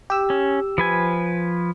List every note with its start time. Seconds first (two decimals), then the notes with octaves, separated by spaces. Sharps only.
0.10 G4 E6
0.30 C#4
0.78 F3 B4 G#5